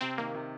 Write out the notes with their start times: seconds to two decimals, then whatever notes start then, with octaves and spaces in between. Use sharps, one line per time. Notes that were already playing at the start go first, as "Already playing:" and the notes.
0.01 C3 C4
0.18 D#3 A#3
0.35 C3